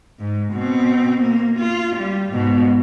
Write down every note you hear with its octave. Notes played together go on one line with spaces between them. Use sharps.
G#2
B2 C4
A#3
F4
G3
G#2 B2